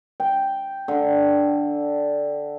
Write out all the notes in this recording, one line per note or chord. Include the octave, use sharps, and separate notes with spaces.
G5
D3